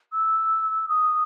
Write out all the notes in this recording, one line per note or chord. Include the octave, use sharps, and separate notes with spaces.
E6
D#6